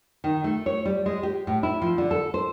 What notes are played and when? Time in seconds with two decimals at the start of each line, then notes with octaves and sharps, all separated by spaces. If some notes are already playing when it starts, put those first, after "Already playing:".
0.24 D#3
0.44 A3
0.66 C#5
0.85 G3
1.06 G#3
1.23 G4
1.47 A2
1.63 E4
1.82 F3
1.98 D3
2.11 A4
2.34 C5